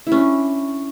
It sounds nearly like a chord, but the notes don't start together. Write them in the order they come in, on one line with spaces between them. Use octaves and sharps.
E4 C#4 D4